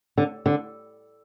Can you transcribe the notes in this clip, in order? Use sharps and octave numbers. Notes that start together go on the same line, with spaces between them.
D3
D3